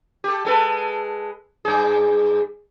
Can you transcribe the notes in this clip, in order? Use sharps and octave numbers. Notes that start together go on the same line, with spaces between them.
G4 A4
G#3 A4 B4
G2 G#4